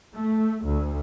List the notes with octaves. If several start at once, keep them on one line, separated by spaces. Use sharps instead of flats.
A3
D2